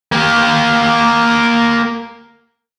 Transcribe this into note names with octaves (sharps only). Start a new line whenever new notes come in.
A#3 G4